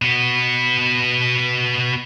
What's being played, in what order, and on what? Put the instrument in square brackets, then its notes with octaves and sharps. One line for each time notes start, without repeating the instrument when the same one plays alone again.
[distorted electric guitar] B2 B3